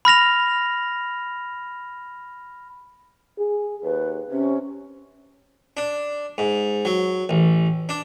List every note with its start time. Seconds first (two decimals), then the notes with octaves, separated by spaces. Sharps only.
0.05 B5 F6 A#6 F7
3.38 G#4
3.83 D#2 B4
4.30 C3 C#4
5.77 D4
6.38 G#2
6.85 F#3
7.29 A1
7.89 D4